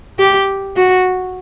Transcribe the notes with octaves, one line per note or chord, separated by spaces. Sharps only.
G4
F#4